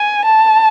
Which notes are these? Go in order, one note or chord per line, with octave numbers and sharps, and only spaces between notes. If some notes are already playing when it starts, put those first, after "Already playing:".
Already playing: G#5
A5